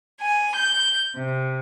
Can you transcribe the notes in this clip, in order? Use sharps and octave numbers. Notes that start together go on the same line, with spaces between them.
G#5
G6
C3